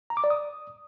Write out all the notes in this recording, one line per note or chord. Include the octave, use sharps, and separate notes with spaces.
A#5
D6
D5
D#6